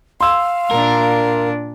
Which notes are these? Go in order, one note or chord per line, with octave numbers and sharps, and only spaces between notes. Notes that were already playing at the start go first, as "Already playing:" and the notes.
F5 C6 E6
A#2 D4 A#4